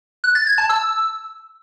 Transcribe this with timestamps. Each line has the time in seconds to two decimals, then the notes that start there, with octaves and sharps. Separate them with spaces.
0.24 F#6
0.35 A6
0.47 G#6
0.58 A5
0.70 E6